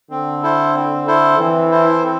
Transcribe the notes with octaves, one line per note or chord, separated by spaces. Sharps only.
D3 C4
E4 A4 C5
C4
E4 A4 C5
E3 C4
E4 A4 C5
C4